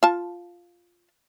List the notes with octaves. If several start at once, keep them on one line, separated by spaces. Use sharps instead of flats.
F4 A5